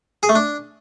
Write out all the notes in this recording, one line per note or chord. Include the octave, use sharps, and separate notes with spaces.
G#4
A3
D4